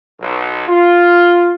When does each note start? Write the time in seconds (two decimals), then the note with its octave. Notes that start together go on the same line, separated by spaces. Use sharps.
0.20 B1
0.68 F4